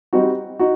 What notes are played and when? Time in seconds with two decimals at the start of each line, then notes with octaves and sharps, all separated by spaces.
0.13 G3 C4 D#4 F#4
0.59 D#4 F#4